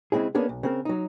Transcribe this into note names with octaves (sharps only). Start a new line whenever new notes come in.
C#3 G#3 C4 E4 G#4
A#3 B3 C#4 D4 G#4
B1
C#3 C4 A#4
F#3 D#4